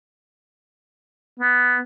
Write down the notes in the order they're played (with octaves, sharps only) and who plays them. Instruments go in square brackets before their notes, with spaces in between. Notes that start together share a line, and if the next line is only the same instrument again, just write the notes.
[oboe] B3